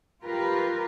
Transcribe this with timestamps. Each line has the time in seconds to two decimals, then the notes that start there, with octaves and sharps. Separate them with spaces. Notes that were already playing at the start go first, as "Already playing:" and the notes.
0.22 F4 G4 A#4 B4